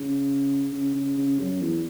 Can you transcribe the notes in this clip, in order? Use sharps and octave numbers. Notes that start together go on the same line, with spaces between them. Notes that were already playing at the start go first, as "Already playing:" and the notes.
Already playing: C#3
C#3
C#3
C#3
F#2
E2